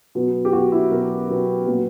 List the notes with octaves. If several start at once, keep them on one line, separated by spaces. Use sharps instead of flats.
B2 F#3 B3
G4
B2 F#3 B3 F#4
E4
B2 F#3 B3 A#4
B2 F#3 B3
A#2 F#3 B3